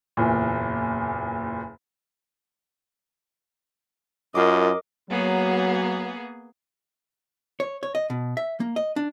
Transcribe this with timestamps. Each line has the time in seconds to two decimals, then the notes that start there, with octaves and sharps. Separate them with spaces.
0.17 F#1 E2 A#2
4.35 F#2 F4 A#4 D#5 D6
5.10 F#3 A#3 B3 G#4
7.60 C#5
7.83 C#5
7.95 D#5
8.10 B2
8.37 E5
8.60 A#3
8.76 D#5
8.96 D4